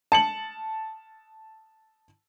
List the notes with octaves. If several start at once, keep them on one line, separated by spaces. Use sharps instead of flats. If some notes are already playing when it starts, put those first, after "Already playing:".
A5 C#7 F#7